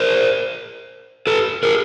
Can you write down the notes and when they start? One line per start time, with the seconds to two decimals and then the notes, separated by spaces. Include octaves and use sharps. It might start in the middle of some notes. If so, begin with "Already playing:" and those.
Already playing: A#4 C5
1.27 A4 B4
1.63 G#4 A#4